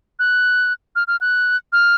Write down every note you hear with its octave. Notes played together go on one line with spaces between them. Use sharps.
F#6
F6
F6
F#6
F6